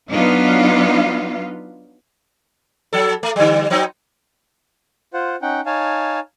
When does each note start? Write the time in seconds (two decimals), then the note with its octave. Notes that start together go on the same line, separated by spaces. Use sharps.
0.11 F#3 B3 D4 D#4 F4 F5
2.93 F#3 A4
3.23 A3
3.36 D3 G3
3.70 F#3 C4 D#4
5.14 F4 C5 F#5
5.42 C#4 D#4 F#5 G5
5.66 D#4 C#5 F5 G#5 A5